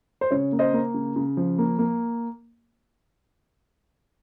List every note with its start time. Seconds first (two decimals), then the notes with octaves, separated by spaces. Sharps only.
0.21 C5
0.31 C#3 C#5
0.52 A#3
0.59 C5 D#5
0.73 A#3
0.94 C#3
1.16 C#3
1.37 F3
1.58 A#3
1.79 A#3